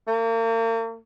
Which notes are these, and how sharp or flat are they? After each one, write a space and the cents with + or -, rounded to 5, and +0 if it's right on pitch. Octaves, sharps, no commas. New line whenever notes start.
A#3 -40